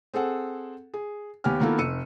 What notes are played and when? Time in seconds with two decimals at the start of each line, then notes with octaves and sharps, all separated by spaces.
0.14 C4 G#4 A4 F#5
0.94 G#4
1.44 D#2 B3 G4 G#5 F6
1.61 D#3 A#3 B3 E4 F4 A4
1.78 F1 E6 C#7 D#7